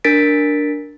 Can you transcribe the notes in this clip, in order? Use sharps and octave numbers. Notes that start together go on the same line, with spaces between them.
D4 A#4 A6 B6 D7